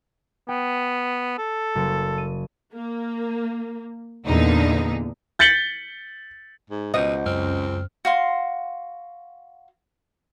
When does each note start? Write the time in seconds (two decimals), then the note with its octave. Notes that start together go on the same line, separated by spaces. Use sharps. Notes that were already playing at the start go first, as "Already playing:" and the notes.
0.48 B3 G5
1.38 A4
1.75 F#1 C6 C#7
2.18 D#7
2.74 A#3
4.26 E2 A#2 D3 D#4
5.39 G6 A6 B6 C#7 F#7 G7
6.70 G#2
6.94 C#2 B2 C5 D#5 F#5 G6
7.26 F#2 C4 F6
8.05 F#4 F5 C6